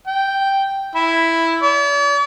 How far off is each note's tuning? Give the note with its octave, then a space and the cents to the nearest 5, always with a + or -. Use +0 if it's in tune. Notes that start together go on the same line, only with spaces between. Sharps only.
G5 -5
E4 +0
D5 -45